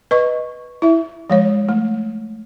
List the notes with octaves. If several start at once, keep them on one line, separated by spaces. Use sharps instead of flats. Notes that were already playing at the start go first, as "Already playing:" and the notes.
B4 D#5 C#6
E4 E5
F3 G#3 C#5
A3